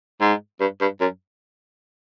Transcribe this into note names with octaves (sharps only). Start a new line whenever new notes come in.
G#2
G2
G2
F#2